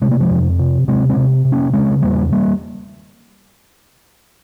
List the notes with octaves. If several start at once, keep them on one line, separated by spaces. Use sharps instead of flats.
C3 G#3
A#3
F3 G#3
F2
C3
C3 G#3 C4
G#3 C4
C3
C3
A#3 C#4
C#3 G#3 C4
E2 G3 A#3
G3 A#3